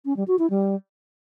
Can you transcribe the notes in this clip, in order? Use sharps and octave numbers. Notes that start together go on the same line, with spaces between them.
C#4
G3
F#4
E4
G3